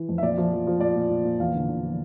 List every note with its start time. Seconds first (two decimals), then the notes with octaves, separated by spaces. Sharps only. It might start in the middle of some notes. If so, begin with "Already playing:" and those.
Already playing: E3
0.09 F2
0.18 E5
0.22 A#2 D5
0.38 F3
0.52 F3
0.67 F3
0.81 A#2 D5
0.96 A#2
1.10 A#2
1.25 A#2
1.39 E2 F5
1.55 D3
1.69 D3
1.84 F3